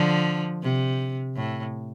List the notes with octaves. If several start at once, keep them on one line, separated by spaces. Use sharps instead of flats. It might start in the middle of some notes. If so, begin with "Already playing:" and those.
Already playing: D3 F3
C3
A2